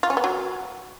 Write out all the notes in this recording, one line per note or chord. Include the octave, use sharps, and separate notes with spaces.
F4
C#4
B3
F#3